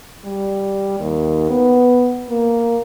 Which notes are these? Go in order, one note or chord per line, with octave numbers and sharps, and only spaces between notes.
G3
D#2
B3
A#3